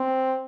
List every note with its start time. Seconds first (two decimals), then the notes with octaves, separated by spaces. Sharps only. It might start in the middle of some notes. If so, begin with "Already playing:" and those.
Already playing: C4